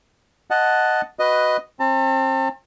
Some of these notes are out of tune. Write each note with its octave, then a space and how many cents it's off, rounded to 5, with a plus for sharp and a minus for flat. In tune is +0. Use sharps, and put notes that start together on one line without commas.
D#5 +0 F#5 +0 A5 +0
F#4 +0 B4 +5 D#5 +0
C4 +35 A5 +40